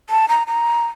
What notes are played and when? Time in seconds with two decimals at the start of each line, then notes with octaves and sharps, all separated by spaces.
0.10 A5
0.29 A#5
0.47 A#5